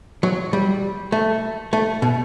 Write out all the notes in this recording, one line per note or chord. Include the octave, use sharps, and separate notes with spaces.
F#3
G3
A3
A3
B2